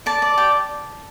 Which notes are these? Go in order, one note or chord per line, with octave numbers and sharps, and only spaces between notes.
D5 A5
D5
G4